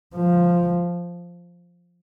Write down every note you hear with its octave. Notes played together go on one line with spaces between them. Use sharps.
F3